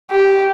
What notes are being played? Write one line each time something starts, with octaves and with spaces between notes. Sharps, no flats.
G4